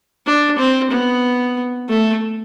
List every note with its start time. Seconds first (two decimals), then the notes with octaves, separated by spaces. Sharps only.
0.27 D4
0.58 C4
0.91 B3
1.89 A3